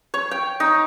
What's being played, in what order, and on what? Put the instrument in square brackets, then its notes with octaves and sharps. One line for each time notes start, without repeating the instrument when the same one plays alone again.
[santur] C#5
G5
D#4